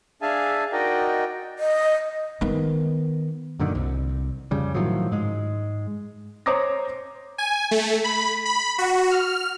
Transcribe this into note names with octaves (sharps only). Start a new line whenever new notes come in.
D4 G#4 E5 F5 G#5 A5
D#4 F#4 A#4 D5 D#5 G5
D#5
D#3 B3
F#2 A#2 D3 D#3
C2
F2 C#3 G3
A2 D#3 F3 F#3
G#2 G#3
C5 C#5 A#5 D6 D#6 A#6
G#5
A3
B5
B5
F#4
F6